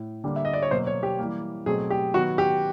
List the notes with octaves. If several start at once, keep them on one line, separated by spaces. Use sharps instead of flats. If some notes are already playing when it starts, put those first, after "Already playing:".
Already playing: A2
D3 G3 A#3
E5
D#5
D5
C#5
B2 F#3 A#3 C5
C#5
G4
E3 G3 A#3
B2 F#3 A3 C4 G#4
G4
D#3 F#3 B3 F#4
G4